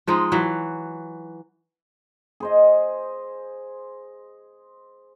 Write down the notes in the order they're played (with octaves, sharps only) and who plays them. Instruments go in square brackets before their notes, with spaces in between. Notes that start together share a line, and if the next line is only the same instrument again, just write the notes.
[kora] F3 G#3 D#4
E3 F#3
[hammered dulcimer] G#4 C5 D#5